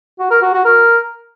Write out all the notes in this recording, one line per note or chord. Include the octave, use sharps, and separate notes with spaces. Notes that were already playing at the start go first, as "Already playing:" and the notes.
F#4
A#4
F#4
F#4
A#4